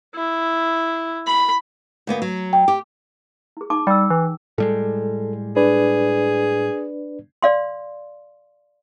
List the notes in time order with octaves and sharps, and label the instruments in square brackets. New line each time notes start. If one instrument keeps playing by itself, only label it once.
[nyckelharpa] E4
B5
[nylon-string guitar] D2 A#3 B3
F#3
[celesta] G5
[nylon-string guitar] G4
[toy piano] E4 G#4
D#4 A5 D6
[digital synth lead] G3 [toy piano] G5 E6
[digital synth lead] E3
[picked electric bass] A2 G3 G#3 [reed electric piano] A4
[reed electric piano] D4 B4 D5 [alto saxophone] G#4
[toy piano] D5 F5 C6